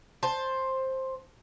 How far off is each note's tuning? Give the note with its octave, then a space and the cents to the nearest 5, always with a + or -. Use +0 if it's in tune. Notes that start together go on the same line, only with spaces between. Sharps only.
C5 +10 A5 +0